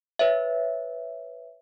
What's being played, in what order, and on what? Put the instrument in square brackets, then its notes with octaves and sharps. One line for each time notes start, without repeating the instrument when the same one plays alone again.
[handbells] B4 C#5 E5